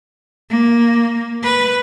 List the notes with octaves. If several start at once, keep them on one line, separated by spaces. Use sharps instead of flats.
A#3
B4